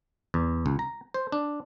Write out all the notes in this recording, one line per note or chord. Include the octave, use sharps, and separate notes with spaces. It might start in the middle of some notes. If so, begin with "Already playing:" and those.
E2
C#2
A#5
C5
D4